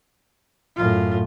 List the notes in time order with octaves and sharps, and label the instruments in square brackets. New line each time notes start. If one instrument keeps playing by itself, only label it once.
[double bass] F#2 A2 [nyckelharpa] F4